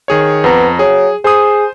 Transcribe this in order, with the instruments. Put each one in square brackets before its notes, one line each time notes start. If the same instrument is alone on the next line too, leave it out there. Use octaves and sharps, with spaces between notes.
[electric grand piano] D#3 G#4 C#5
[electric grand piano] F2 A#5 [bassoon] B3
[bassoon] F#3 [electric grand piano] G#4
[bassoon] G#4 [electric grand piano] C5 D#6